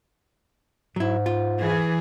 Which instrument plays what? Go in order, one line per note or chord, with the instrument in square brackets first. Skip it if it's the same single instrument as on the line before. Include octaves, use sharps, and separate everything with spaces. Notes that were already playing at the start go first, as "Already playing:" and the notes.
[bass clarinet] G#2 [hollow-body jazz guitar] F#3 E4
[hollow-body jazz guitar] F4
[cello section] E3 G#4